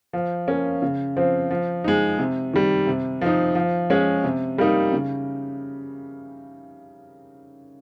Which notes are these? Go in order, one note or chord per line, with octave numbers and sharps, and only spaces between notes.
F3
A#3 C#4
C#3
F3 C4
F3
G#3 D#4
C3
D#3 G3
C3
F3 C4 D#4
F3
G#3 C#4
C3
G3 A#3 D#4
C#3